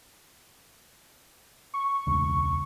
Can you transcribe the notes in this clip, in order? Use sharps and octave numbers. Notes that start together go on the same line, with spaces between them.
C#6
E1 C#2